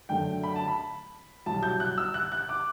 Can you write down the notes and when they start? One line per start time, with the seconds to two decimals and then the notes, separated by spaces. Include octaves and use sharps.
0.09 F#2 D3 F#3 A3 G5
0.44 B5
0.56 A5
0.68 B5
1.46 C2 B2 F#3 A5
1.63 G6
1.80 F#6
1.98 E6
2.14 F#6
2.32 F#6
2.49 D6